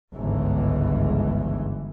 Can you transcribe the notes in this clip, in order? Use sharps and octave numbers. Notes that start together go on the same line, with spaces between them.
G1 C#2 G#2 E3